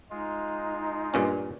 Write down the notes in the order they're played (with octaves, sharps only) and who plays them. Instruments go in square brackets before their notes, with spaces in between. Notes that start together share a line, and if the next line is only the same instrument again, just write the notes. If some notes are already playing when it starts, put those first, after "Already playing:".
[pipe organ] G#3 F4 [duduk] D#4
[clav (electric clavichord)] G2 A#2 C#4